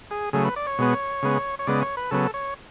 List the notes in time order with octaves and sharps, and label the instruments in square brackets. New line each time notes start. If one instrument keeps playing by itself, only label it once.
[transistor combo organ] G#4
C#3 F#3 A3 G#4
B4
D5
C#5
B2 G#3 B3
C#3 G#3 B3
C#5
C#3 G#3 B3 D5
C#5
B4
C#3 F#3 B3 A4
C#5